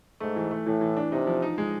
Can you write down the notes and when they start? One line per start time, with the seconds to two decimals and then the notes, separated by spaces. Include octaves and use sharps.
0.20 G#2 A3
0.36 E3
0.51 A3
0.66 A2 E3
0.81 E3
0.96 D4
1.12 C3 D#4
1.27 F3
1.42 D#4
1.58 G#3